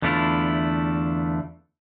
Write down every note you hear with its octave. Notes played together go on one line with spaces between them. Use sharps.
E2 D3 A3 D4 E4 F4